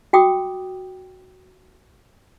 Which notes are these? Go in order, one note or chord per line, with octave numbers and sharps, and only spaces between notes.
F#4 G5 D6 D#6